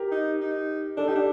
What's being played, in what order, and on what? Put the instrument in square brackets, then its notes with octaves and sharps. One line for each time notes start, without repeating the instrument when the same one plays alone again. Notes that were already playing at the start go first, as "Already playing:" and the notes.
Already playing: [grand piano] G4 A#4
[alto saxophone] D#4
D#4
[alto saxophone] D4 [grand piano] A4
[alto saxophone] D#4 [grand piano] G4
[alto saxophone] D4